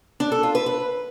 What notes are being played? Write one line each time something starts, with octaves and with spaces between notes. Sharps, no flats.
D4
A4
F4
B4
B4